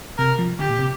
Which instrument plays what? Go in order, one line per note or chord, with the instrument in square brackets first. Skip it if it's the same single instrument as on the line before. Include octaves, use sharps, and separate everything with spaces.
[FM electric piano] C3 [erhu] A#4
[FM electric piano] F3
[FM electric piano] D3 [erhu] G4
[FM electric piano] A#2
C3